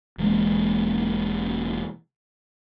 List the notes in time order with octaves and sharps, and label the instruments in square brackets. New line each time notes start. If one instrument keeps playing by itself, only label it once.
[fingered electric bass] E1 E3 G#3 A#3